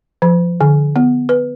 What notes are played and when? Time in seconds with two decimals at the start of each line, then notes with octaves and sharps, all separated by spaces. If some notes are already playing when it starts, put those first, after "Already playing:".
0.22 F3
0.61 D3
0.96 B3
1.29 B4